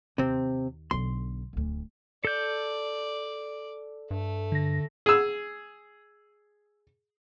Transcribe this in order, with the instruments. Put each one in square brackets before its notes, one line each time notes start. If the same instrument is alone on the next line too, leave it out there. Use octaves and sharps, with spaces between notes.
[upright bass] D#2 [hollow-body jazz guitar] C3 C4
[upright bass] B1 D3 [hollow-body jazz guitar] C6
[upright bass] D1 D2
[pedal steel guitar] A4 G6 [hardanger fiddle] D5
[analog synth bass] G2 [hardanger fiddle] A3
[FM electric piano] D3 A#6
[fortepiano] G#4 E6